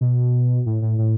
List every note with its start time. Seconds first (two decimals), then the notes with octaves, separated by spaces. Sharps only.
0.01 B2
0.66 A2
0.82 A2
0.98 A2